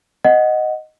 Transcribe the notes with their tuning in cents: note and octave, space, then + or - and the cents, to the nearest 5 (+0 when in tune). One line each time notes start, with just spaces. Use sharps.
D#5 +0 F#5 +0